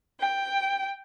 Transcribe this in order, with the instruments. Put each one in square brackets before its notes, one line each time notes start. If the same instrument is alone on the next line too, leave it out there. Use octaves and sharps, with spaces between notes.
[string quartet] G5